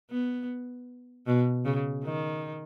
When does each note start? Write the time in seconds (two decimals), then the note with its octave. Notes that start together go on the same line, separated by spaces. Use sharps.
0.11 B3
1.27 B2
1.65 C#3
2.04 D#3